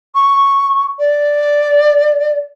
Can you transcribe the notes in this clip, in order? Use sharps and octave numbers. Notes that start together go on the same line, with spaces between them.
C#6
D5